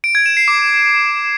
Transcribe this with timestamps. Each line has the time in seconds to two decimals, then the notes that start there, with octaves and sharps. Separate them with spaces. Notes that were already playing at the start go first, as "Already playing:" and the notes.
0.04 D7
0.15 G#6
0.26 E7
0.37 C7
0.48 D6